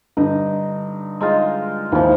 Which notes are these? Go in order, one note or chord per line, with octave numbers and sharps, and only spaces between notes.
G2 D3 D#4
G#3 D#4 F4
D#2 G#2 E3 F3